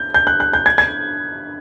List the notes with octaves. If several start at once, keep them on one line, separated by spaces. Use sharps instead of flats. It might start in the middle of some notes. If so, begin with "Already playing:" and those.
Already playing: G6
G6
F#6
F#6
G6
G#6
G#6